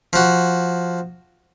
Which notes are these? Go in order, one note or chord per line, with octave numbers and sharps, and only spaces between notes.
F3 F#4